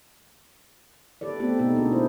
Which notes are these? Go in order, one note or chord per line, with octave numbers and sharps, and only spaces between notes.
G4 A4 B4 D5
A3 B3 C4 G4 A4
B2 B3 D#4 A4
A#3 D4 F#4 G#4
E4 C5